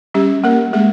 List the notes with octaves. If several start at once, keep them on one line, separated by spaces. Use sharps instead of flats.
G3 C#4 G4
G3 A#3 A#4
G#3 A#3 G#4